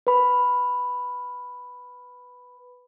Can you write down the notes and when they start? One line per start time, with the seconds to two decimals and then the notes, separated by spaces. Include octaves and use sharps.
0.07 B4 B5